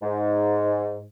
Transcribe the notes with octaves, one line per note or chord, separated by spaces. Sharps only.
G#2